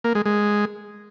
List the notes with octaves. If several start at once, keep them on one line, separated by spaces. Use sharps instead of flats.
A#3
G#3
G#3